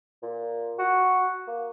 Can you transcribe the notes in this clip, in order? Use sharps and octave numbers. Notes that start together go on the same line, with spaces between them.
A#2
F#4
A#3